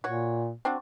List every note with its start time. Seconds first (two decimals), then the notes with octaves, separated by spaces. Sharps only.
0.04 A#2 F#4 C#5
0.65 C4 D4 F#4